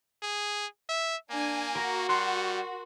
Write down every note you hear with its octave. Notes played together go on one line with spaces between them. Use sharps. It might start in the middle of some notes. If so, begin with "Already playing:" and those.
G#4
E5
A#3 D4 G#5
F#4 A#4
G3 C6 F#6 C#7